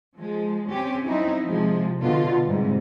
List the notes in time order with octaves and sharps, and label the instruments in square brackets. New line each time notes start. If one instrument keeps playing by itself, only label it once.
[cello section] F3 G#3
C4 C#4 G4
F#3 C4 D#4 E4
C3 F3 G#3
B2 D3 F4
G#2 C3 G3